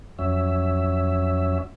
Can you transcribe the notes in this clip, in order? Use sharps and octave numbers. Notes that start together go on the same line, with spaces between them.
F2 F#3 C#4 E5